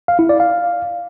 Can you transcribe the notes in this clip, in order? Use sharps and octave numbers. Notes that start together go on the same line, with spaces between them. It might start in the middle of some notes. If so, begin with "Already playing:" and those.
F5
E4
D5
F5